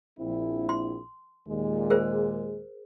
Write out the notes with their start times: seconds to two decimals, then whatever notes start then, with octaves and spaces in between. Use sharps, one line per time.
0.19 A#1 C4 E4
0.69 C6
1.47 D#2 A#2 G#3
1.90 G#4 A#4 C5